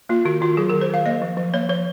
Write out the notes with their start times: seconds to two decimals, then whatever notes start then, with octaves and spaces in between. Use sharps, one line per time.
0.09 A#3 F4
0.25 D#3 F#4
0.41 D#3 F4
0.57 F#3 G#4
0.70 A#4
0.73 D#3
0.81 C5
0.90 D#3 F5
1.06 A#3 D#5
1.22 F3
1.37 F3
1.54 A#3 C#5
1.69 F3 C#5